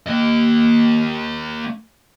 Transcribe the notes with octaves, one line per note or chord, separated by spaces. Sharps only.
A#3 D#5